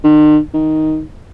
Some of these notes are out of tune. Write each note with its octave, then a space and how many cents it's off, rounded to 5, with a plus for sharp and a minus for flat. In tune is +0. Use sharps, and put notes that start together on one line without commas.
D#3 -45
D#3 +5